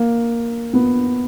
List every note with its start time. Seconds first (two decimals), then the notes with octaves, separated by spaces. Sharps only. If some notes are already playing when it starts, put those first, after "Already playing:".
Already playing: A#3
0.73 B3